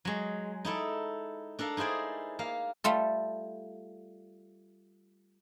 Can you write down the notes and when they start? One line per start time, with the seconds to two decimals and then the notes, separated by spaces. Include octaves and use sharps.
0.05 F#3 G#3
0.65 D#4 E4 A4 D5
1.59 D4 A4 A#4 F5
1.77 D#4 E4 G#4 C5 D5
2.39 A#3 F5
2.84 G3 A3 F4 A4